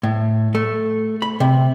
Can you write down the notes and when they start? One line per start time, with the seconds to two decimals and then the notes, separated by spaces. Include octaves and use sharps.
0.03 A2
0.55 A3
1.22 B5
1.40 C3